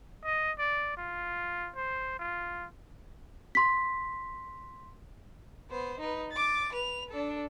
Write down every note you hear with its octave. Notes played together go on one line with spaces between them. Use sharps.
D#5
D5
F4
C5
F4
C6 B6
B3 C5
D#4 B4
D6 A6
B4 F7
D4 A4